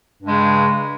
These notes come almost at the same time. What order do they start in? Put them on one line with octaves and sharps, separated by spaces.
G2 G#3 C#3